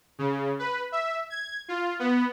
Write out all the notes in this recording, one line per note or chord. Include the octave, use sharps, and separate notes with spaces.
C#3
B4
E5
G#6
F4
B3